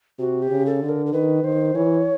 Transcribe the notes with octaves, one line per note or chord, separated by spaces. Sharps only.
C3 F#4
G4
C#3
A4
D3
A#4
A#4
D#3 B4
D#3 C5
E3 C#5